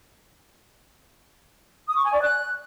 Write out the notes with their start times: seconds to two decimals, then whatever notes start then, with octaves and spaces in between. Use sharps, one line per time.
1.88 D#6
1.96 C#6
2.05 G#5
2.13 D5
2.22 F#6